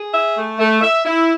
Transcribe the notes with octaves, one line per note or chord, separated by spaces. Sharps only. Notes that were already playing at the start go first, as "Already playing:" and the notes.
Already playing: G#4
E5
A3
A3
E5
E4